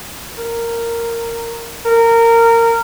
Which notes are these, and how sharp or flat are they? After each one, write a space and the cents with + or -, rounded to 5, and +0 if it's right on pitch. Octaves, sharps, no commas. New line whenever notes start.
A#4 -10
A#4 -20